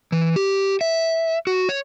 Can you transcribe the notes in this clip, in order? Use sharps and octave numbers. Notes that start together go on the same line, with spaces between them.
E3
G4
E5
F#4
C#5